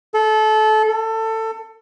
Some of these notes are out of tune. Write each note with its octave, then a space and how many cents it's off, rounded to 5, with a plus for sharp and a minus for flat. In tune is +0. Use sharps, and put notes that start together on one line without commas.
A4 -25
A4 +20